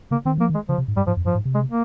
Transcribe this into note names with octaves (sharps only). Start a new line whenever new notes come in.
C#3 A#3
D#3 C4
F3 A#3
D#3
G#3
C#3 F3
C3
G#2
G2 G3
G#2 F3
F2
G2 F3
G#2
C3
G#3
A#3